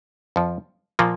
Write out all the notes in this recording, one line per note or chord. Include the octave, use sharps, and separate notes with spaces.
F2 F3
A#2 F3 A#3